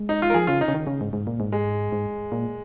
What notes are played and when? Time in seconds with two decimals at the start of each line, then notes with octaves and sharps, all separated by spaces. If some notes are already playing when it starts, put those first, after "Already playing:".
Already playing: G#3
0.09 D#4
0.22 F4
0.30 A#4
0.34 F3 G#4
0.47 C#3 F4
0.61 D#4
0.68 C#3
0.74 D#3
0.87 C#3
1.01 G#2
1.13 G#2
1.27 A#2
1.40 G#2
1.52 G#3
1.92 G#2
2.32 A#2